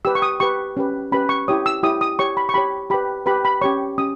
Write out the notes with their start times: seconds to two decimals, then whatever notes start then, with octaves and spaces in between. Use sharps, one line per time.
0.05 G4 B4 E6
0.15 C#6
0.22 D#6
0.40 G4 B4 C#6
0.77 C#4 G4 B4
1.12 C#4 G4 B4 B5
1.29 C#6
1.48 E4 G4 C#5 D#6
1.66 E6
1.83 E4 G4 C#5 D#6
2.01 D#6
2.19 G4 C#5 C#6
2.37 B5
2.49 C#6
2.54 G4 C#5 B5
2.90 G4 B4 B5
3.26 G4 B4 B5
3.45 B5
3.61 C#4 G4 C#5 C#6
3.98 C#4 G4 D#6